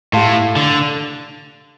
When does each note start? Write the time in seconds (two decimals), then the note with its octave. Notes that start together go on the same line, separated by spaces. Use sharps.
0.13 A2 G4 F5 A5 C6
0.56 D3